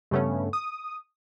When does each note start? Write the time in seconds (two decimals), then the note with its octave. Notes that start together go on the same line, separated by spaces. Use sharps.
0.11 G2 C#3 A3 B3 C#4
0.53 D#6